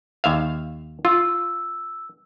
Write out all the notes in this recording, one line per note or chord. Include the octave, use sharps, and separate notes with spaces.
D#2 E5 F5
F4 E6